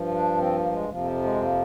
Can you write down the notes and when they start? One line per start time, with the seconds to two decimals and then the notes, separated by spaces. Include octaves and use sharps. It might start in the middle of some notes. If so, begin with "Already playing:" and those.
Already playing: G2 F3
0.12 D4
0.38 C4
0.55 A#3
0.72 G#3
0.89 F2 C3 F3 A#3
1.24 G#3
1.41 A#3